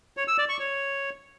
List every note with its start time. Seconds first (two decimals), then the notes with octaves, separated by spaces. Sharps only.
0.17 C#5
0.28 E6
0.38 D5
0.49 C#6
0.60 C#5